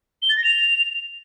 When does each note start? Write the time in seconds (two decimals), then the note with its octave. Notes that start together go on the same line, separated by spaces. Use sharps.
0.22 G7
0.30 A6
0.37 A#6
0.44 F7